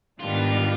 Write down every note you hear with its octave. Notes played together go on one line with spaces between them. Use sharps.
G#2 D#3 G3 B3 D4 F4